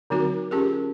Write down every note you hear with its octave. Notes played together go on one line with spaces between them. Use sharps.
D3 F#3 C4 D#4 F#4 A#4
C#4 F4 G4 G#4 A#4